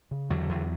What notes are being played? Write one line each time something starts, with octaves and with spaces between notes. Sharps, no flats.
C#3
E2 D3 F#3
E2